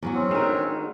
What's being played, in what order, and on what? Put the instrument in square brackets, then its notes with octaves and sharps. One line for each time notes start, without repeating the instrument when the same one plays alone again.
[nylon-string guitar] E2 F#3 F#4
[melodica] C4 C#4
[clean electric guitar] D3 D#3 G#3 [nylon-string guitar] G#4 A#4